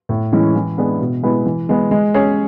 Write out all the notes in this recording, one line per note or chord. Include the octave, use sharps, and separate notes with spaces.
A2
E3 G#3 C#4 E4
E3
G#3 B3 D4 G#4
B2
G#3 B3 E4 B4
E3
G#3 B3
G#3
C#4 G#4 C#5